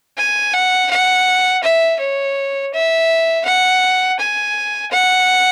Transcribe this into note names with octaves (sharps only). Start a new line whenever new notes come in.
G#5
F#5
F#5
E5
C#5
E5
F#5
G#5
F#5